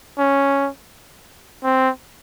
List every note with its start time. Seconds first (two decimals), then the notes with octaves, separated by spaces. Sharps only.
0.18 C#4
1.64 C4